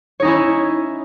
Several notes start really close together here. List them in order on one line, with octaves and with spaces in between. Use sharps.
C#5 D#4 C#4 E4